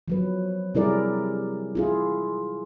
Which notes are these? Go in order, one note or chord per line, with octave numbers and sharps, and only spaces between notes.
F3 F#3 B4
C3 G3 E4 G#4 A#4 D5
E4 F4 G#4